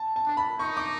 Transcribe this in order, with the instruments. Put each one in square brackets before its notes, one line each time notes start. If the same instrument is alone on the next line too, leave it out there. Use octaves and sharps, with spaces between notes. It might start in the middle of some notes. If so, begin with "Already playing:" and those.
Already playing: [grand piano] A5
A5
[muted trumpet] D4
[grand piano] B5
[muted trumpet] D#4 [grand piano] C#6
[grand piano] D6